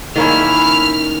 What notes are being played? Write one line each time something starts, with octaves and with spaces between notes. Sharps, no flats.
D#3 A#3 C#4 E4 F6